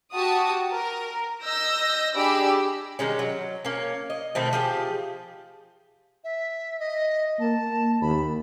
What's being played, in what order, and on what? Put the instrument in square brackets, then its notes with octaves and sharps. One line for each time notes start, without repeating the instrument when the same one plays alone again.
[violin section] F#4 G4 A5 D#6
A#4
D#5 E6 G6 A#6
D4 G4 G#4 B5 D6 E6
[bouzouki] D#3 G3 G#3 C#4
F#3
A#3 C#4
D#5
B2 D#3 A3 C4
F3 G4 G#4
[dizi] E5
D#5
[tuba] A#3 [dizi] A5
[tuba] D#2 [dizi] B5